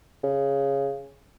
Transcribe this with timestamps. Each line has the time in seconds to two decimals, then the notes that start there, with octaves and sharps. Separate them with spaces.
0.23 C#3